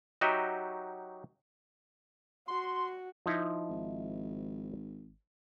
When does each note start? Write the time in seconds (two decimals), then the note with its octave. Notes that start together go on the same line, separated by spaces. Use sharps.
0.21 F#3 D#4 F#4 G4 D#5 E5
2.48 F#4 C6
3.26 F3 D#4 E4
3.69 G#1